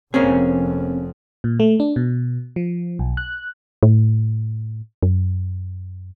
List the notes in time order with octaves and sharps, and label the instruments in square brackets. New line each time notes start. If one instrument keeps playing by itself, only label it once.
[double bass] F1 F2 [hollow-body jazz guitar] A#3 C#4 G#4 [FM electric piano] C4
[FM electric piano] A#2
A3
D4
B2
F3
B1
F#6
[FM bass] A2
F#2